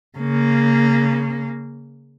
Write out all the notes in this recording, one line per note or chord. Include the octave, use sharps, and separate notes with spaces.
C#3 A#3